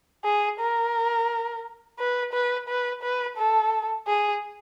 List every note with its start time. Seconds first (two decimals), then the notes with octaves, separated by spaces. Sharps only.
0.25 G#4
0.60 A#4
1.99 B4
2.33 B4
2.68 B4
3.02 B4
3.37 A4
4.07 G#4